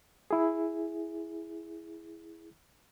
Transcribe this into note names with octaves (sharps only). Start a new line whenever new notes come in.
E4 G#4